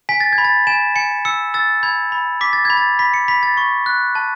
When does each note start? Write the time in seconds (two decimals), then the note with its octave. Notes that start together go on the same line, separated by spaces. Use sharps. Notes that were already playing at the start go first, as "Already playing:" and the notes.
0.09 G#5 B6
0.20 A6
0.33 G#6
0.38 B5
0.45 A6
0.67 G#5 E7
0.96 G#5 C#7
1.25 E6 C#7
1.54 E6 A6
1.83 B5 G#6
2.12 B5
2.41 D6 B6
2.53 A6
2.65 B5 G#6
2.77 A6
2.99 B5 B6
3.14 C#7
3.28 B5 B6
3.43 A6
3.57 C#6
3.86 F#6
4.15 A5